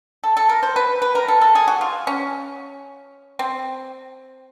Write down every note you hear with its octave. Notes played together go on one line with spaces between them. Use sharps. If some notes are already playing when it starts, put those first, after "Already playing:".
A4
A4
A#4
C5
B4
B4
A#4
A4
A4
G#4
F#4
F4
C#4
C4